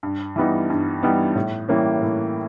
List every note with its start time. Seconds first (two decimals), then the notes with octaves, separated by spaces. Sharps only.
0.03 G2
0.36 E3 G3 B3 D#4
0.70 G2
1.03 E3 G3 B3 D#4
1.35 A2
1.68 E3 G3 A#3 C#4
2.02 A2